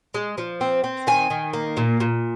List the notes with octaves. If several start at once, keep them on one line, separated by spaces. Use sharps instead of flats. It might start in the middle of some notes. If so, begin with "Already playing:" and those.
G#3
F3
C4
C4
D#3 G#5
D#3
A#3
A#2
A#2